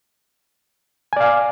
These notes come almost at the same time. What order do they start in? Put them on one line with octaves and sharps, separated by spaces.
G#5 D5 F5